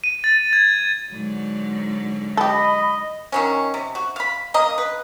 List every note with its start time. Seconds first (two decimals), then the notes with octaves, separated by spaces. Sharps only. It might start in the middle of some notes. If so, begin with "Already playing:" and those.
0.04 D#7
0.24 A6
0.53 G#6
1.11 G#2 D3 F#3
2.37 G4 A4 D#5 B5
3.32 D#3 F#3 C#4
3.74 C3
3.95 F#4
4.16 F5 B5
4.54 A#3 A#4 D#5
4.78 B4